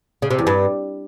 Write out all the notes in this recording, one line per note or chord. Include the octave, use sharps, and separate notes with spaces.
C#3
C3
E2
G2